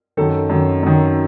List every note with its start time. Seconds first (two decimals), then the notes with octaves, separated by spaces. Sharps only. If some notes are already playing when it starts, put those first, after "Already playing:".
0.17 F#2 D#3 A4
0.49 F#2 D#3
0.83 F#2 D#3